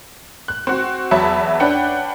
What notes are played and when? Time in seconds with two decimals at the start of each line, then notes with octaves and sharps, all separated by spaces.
0.48 F#6
0.67 C4 F#4
1.11 E2 F#3 E5 A5 B5
1.60 C#4 D4 B4 F#5 G5